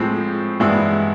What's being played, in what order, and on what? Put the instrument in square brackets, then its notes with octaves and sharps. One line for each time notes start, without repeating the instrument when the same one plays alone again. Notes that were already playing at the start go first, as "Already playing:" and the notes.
Already playing: [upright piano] A2 F3 G#3 C4
G2 E3 G#3 B3 E4